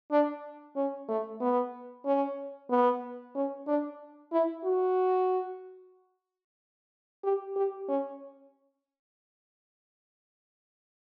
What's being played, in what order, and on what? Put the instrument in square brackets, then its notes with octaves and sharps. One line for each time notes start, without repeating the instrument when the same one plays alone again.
[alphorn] D4
C#4
A3
B3
C#4
B3
C#4
D4
E4
F#4
G4
G4
C#4